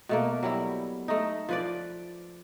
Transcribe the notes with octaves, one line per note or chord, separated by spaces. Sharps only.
B2 A3 A#3
F#3 G3 E4
A3 D#4
F3 B4 D5